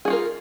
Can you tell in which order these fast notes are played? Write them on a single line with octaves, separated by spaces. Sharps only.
G#4 F#4 F4 A#4